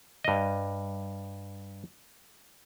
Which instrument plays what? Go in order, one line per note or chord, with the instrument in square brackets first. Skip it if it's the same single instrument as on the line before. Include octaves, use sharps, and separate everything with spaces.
[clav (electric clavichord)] G2 D#5